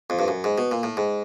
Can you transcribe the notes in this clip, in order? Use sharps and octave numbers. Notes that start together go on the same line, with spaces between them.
F2
G2
F#2
G#2
B2
A#2
A2
G#2